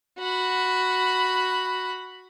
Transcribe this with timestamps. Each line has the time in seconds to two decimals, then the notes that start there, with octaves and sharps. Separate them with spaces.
0.18 F#4 B5